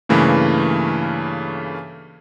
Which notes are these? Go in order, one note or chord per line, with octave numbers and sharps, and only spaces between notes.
G2 C#3 E3 A3 A#3